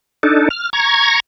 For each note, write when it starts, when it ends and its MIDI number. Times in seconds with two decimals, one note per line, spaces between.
0.23 0.49 62
0.23 0.49 63
0.23 0.49 69
0.50 0.70 89
0.73 1.20 82
0.73 1.20 85
0.73 1.20 92